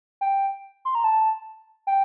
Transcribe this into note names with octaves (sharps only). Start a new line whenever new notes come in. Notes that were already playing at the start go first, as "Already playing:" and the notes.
G5
C6
A#5
A5
G5